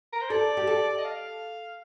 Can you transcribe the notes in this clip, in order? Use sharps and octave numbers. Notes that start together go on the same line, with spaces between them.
A#4
C5
A4 D5
G4
A4
D#5
F5